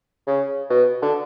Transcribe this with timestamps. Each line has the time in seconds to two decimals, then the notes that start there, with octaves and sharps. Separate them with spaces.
0.27 C#3
0.70 B2
1.02 D3